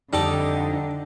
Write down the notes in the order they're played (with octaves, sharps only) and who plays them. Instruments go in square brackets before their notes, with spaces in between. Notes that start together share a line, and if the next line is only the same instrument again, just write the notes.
[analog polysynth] F2 D#4 [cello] D3 [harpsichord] G3 A4 D6